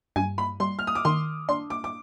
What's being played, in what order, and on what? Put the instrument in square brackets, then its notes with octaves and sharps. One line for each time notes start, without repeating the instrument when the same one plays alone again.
[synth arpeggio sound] G2 [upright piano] G#5
[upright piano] B5
[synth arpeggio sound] G3 [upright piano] C6
[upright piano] F6
D#6
D6
[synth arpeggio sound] D#3 [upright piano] C6
[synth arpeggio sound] D4 [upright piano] C6
[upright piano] D6
D6